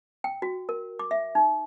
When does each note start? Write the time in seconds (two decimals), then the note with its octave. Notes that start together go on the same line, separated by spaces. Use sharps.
0.24 G5
0.42 F#4
0.69 A#4
0.99 D6
1.11 E5
1.35 D#4